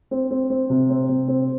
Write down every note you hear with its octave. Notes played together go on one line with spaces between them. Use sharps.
C4
C4
C4
C3
C4
C3
C4